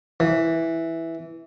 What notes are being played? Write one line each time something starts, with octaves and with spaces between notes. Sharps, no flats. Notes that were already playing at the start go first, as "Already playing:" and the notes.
E3